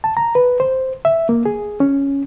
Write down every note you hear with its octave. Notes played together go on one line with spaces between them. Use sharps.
A5
A#5
B4
C5
E5
A#3
G#4
C#4